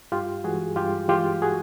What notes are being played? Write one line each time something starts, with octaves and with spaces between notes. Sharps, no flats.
G2 F4 G4
E3 G#3 F#4 G#4
G2 F4 G4
E3 G#3 F4 G4
F#4 G#4